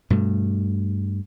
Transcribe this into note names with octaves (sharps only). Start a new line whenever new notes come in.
G2 B2 A3